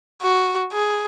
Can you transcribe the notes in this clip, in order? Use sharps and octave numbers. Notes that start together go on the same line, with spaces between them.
F#4
G#4